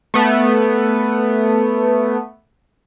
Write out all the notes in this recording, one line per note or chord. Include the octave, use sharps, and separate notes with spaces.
A3 B3